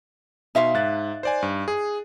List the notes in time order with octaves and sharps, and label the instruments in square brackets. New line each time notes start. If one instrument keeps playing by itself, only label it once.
[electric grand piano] B2 C6 [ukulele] D#4 E5 F5
[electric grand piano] G#2 F#6 A6
C5 D5 G#5
G2
G#4